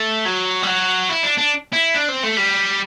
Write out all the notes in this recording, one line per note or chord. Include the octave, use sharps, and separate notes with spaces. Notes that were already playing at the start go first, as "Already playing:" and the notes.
Already playing: A3
F#3
G3
F#3
E4
D4
D4
E4
D4
C4
A3
G3